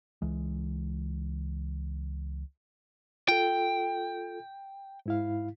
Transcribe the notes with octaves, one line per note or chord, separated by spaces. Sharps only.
C#2 E3 G#3
F4 A4 G5
G#2 E4 F5